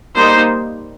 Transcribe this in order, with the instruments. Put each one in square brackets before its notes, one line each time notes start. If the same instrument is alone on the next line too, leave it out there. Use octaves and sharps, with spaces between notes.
[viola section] G3 A#3 D#4 C5